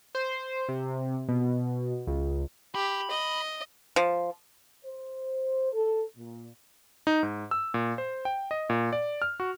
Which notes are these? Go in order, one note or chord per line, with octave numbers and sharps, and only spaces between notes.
C5
C3
B2
C#2
G4 B5
D#5
F3
C5
A4
A#2
D#4
G#2
E6
A#2
C5
G5
D#5
A#2
D5
F6
F#4